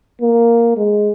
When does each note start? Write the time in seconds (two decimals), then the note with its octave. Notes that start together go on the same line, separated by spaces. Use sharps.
0.21 A#3
0.77 G#3